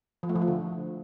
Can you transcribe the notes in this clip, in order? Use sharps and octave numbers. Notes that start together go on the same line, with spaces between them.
F3
A3
F3
A3
D3